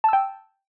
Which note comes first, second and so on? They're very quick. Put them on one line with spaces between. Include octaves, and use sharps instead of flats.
A5 E6 G5